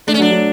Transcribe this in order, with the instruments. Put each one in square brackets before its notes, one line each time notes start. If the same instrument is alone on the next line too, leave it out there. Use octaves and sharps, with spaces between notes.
[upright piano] A3 [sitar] D4
[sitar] C#4
[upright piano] F#3 [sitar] D4
[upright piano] F#3